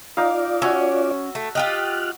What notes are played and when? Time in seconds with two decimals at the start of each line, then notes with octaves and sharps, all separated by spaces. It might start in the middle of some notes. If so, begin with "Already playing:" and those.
0.17 D#4 F4 D5 F5
0.62 C#4 F#4 C#5 E5
1.35 A3
1.55 F4 G4 D#5 F6 F#6